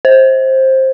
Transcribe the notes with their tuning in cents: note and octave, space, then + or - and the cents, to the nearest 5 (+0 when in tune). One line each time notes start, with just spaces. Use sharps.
C5 +15